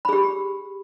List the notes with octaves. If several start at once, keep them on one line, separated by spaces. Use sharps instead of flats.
G4 G#4 B5